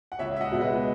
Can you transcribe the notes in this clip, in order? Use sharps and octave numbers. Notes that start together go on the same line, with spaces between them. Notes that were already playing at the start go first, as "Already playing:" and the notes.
F#5
C#2 C#5 E5
E5
D#5 F#5
B2 G#3
B4 D#5